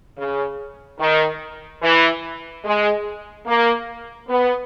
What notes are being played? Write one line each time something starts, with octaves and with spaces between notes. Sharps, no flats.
C#3
D#3
E3
G#3
A#3
B3